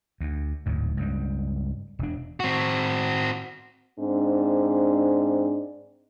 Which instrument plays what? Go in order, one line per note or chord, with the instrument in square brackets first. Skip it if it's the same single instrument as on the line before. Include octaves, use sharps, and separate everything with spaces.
[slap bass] D2
D1 D2 G#2
C#2 G2 G3
E1 D4
[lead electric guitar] C4 F#4
[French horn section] G#2 C4 D4